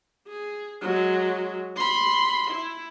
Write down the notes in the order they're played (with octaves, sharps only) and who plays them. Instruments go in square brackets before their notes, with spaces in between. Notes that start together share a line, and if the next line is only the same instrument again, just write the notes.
[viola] G#4
F#3 G#3
B5 C6
E4